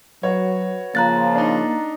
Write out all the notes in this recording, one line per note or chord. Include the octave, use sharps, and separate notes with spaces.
F#3 F#4 B4 C#5
C#3 F3 A#3 A#5 F#6 A6
D4 D#4